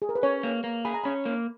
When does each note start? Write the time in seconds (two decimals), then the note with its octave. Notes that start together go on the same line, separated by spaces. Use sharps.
0.02 G#4
0.09 A#4
0.15 B4
0.23 C#4 C#5
0.43 A#3
0.64 A#3
0.85 G#4 B5
0.94 A#5
1.04 C#4 B5
1.25 A#3